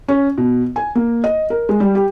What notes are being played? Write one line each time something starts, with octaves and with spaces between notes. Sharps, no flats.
C#4
B2
G#5
A#3
D#5
A#4
G#3
G3
G4